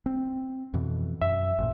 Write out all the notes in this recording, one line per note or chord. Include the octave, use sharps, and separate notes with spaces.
C4
F2 B2 E3
F#2 E5
A1 A#2